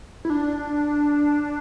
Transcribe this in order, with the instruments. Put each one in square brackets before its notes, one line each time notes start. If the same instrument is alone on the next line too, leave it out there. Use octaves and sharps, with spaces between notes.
[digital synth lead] E4
D4